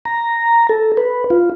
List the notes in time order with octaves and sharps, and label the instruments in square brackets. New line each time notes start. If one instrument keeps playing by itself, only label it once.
[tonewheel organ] A#5
A4
B4
F4